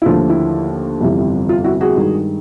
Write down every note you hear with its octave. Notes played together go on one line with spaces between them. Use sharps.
E4
D#2 D3 F3 A3 F4
E4
G1 F2 C3 E3 G3
F4
E4 F#4
F#4 G#4
G2 D#3 G#3